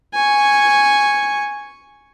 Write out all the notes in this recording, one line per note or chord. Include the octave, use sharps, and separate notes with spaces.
G#5 C#6